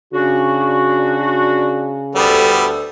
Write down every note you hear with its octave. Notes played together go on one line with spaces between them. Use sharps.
C#3 D4 F#4
D2 G3 B3 A4